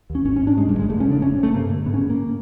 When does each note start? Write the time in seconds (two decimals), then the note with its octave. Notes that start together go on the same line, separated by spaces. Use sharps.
0.10 D#2
0.15 C#4
0.25 G#1 C#4
0.36 C#4
0.42 G#2
0.47 D4
0.58 G2 G#3
0.69 G3
0.74 G1
0.79 G#3
0.90 F1 A3
1.00 C#4
1.05 C#3
1.11 D4
1.22 C3 C#4
1.38 C3
1.43 A3
1.54 G2 A#3
1.70 D3
1.86 G#2 B3
1.94 C#4
2.02 G#2
2.10 A#3